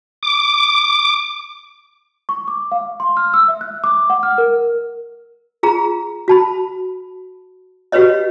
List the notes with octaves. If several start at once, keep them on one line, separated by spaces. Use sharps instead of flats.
D6
C#6
D6
F5
C6
F6
E6
E5
F#6
D6
F#5
F6
A#4
F4 G#4 A#5
F#4 A5 B5
F#4 G4 B4 C#5 D#5